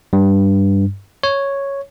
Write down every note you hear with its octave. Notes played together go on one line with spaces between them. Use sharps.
G2
C#5